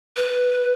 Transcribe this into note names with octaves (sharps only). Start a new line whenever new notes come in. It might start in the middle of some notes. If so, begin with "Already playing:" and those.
B4